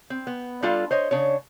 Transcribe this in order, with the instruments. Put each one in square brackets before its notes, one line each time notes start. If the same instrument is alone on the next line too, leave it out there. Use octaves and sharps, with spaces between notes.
[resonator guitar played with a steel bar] C4
B3
G3 D4 F4 A4 F5
C5 C#5 D#5
C#3 D4 C#5